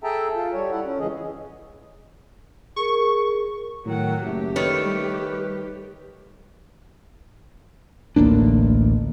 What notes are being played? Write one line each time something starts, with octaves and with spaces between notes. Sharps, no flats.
G#4 A4 E5 G5 A5 A#5
F4 A4
G3 C#5
E4 A4 F#5
C#4
F2 C#3 E3 G#3 G#4 D#5
G#4 A#4 C#6
A2 D#3 F#3 F#5
F#1 A3 G4
D#3 A3 B4 C#5
G3
A1 D2 A#3 D4